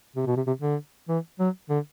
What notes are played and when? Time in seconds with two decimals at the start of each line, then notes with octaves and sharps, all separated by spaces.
0.16 C3
0.26 B2
0.36 C3
0.47 C3
0.61 D3
1.09 E3
1.39 F#3
1.69 D3